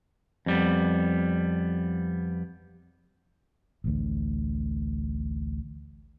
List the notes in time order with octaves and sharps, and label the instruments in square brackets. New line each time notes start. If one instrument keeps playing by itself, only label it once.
[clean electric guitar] F2 G3 B3
[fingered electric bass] A1 D2